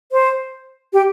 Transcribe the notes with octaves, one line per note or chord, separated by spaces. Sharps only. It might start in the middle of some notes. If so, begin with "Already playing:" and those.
C5
G4